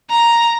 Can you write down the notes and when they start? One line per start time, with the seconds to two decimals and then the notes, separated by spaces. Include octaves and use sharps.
0.10 A#5